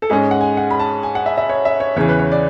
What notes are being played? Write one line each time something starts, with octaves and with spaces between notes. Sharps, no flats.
A4
G#2 G#3 C#4 G#4
F#5
G#5
F#5
B5
A5
G#5
F#5
E5
E5
C#5
E5
C#5
E2 C#3 E3 C#5
B4
C#5
D5